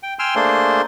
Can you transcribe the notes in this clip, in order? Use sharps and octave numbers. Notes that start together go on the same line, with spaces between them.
G5
G5 G#5 C6 E6 F6
A3 A#3 D4 G#4 C5 C6